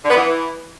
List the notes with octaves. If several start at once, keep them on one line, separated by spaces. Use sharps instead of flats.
D3
B3
E3